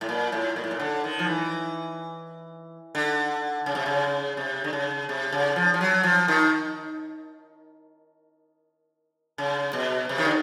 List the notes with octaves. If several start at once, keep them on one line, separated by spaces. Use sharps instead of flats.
A2
A#2
A2
A#2
A2
A#2
D3
D#3
F3
E3
D3
C#3
C3
C#3
C3
D3
C#3
C3
C#3
F3
F3
F#3
F3
D#3
C#3
B2
C3
D#3
D3